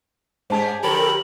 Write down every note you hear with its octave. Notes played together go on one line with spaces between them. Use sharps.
G#2 C#4 G4 G#4 C5 A5
D3 F3 G4 A4 A#4 C#5 B5